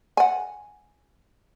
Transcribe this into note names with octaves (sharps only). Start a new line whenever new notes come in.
F#5 G#5